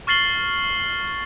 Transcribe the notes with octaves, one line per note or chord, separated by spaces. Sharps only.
C#6 F6 A6 C7 F#7 G7